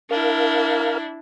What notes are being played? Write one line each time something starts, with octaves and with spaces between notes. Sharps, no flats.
D4 E4 A#4 F5